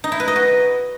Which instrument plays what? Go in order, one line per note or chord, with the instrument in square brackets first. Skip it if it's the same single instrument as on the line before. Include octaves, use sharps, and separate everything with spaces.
[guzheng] D#4
E4
B4
D#5
F#4